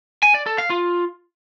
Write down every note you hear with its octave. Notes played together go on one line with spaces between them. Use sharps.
G#5
D5
A4
F5
F4